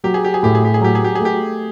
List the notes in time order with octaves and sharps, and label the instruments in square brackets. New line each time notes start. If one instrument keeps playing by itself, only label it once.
[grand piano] F#3 [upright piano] G4
[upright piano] G#4
G4
G#4
[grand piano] A2 [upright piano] G4
[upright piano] G#4
G4
G#4
[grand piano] F#3 [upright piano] G4
[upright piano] G#4
G4
[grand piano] A3 [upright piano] G#4
[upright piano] G4